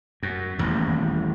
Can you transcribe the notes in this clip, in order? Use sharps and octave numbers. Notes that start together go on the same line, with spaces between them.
F#2
D#1 A1 E2